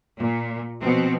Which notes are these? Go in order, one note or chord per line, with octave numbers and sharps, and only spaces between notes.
A#2
B2 F3 B3 C4